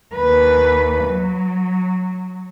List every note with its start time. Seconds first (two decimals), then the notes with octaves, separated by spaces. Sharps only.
0.15 D#2 B4
1.05 F#3